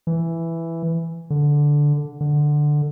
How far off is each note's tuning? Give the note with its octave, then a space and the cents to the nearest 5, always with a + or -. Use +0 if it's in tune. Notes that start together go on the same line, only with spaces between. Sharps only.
E3 +5
D3 -5
D3 +10